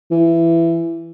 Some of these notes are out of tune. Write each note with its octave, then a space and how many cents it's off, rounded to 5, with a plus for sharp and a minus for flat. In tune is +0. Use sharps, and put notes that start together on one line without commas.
E3 +15